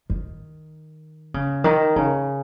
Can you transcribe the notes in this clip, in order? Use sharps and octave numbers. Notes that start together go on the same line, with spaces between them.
D#3
C#3
D#3
C#3